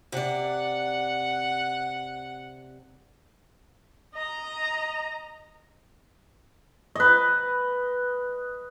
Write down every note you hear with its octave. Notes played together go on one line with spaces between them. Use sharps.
C3 D5 F#5
D#5 A#5
B4 D#5